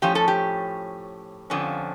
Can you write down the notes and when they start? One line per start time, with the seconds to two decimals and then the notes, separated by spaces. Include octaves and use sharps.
0.02 A2 F3 C#4 G4
0.15 A4
0.28 G4
1.50 F2 D3 F3 C#4